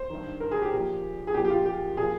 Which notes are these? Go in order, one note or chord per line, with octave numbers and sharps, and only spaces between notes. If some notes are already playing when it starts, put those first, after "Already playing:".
Already playing: C5
G2 D#3
A#4
G#4
G4
A#2 F3
G#4
A#2 F3 G4
G4
F4
G4
A#2 F3 G#4